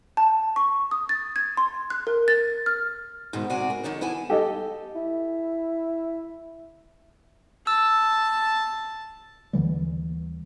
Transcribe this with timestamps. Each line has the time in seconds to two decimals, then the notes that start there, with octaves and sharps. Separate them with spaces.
0.17 A5
0.56 C#6
0.91 D#6
1.09 A6
1.36 G#6
1.57 C6
1.90 F#6
2.07 A#4
2.28 A6
2.66 F6
3.33 G#2 B2 D3 D#3
3.50 C3 F#3 F#4 D5 G#5
3.70 A#4
3.83 F2 D#3 D4 D#4 C#5
4.01 B3 E4 G#5 A5
4.30 G4 A4 D#5
4.95 E4
7.67 A5 E6
9.53 D#2 D3 E3 G3